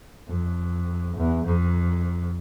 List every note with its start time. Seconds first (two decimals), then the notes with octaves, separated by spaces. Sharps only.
0.29 F2
1.17 E2
1.45 F2